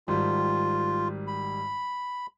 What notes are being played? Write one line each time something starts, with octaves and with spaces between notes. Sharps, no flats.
G#1 G3 F4
B5